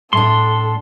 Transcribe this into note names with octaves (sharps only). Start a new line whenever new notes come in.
A2 D4 A4 C6